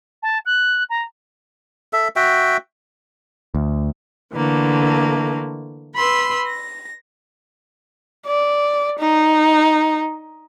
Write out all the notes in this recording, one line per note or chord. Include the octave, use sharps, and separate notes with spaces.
A5
F#6
A#5
A4 E5
F#4 E5 G5
D2
D3 E3 A3 A#3
B4 B5 C6 E6
A#6
D5
D#4